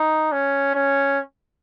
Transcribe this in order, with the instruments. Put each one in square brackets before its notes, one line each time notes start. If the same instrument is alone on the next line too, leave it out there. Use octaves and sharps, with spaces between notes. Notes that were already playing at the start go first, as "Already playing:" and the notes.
Already playing: [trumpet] D#4
C#4
C#4